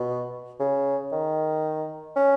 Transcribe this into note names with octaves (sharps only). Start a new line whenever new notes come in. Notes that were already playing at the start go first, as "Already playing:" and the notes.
Already playing: B2
C#3
D#3
C#4